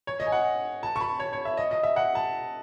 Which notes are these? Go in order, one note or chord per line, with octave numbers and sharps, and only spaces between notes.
C#5
D#5
G#5
F#5
A5
C#6
B5
C#5
C#5
E5
D#5
D#5
E5
F#5
A5